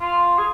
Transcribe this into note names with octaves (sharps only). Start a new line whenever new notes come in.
F4
G#4